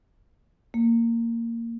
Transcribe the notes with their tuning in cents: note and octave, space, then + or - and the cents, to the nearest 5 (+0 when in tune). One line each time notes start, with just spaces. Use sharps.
A#3 -15